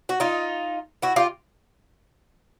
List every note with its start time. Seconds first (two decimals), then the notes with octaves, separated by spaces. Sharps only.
0.09 F#4
0.20 D#4 F4
1.02 E4 F#4
1.16 F4 G4